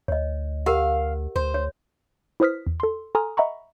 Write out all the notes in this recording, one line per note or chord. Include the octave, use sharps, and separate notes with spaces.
D2 C#5 D#5
G4 A#4 F5 F#5
D2 C5
C#5
E4 B4 C5 D#6 F6 B6
E2
A4 C6
A4 G#5 A#5 C6 D#6 F6
D#5 E5 F#5 A#5 B5 C#6